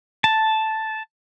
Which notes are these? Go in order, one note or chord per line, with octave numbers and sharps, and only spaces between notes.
A5